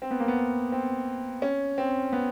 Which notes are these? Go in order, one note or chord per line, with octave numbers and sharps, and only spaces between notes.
C4
B3
A#3
B3
C4
C#4
C4
B3